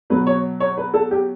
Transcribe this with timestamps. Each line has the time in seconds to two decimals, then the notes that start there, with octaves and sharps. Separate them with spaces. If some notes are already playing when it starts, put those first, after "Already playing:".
0.10 B2 F#3 B4
0.27 C#5
0.60 C#5
0.77 B4
0.94 A4
1.11 G4